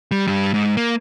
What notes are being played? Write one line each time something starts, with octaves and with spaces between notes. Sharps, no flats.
G3
G2 G3
G#2
A#3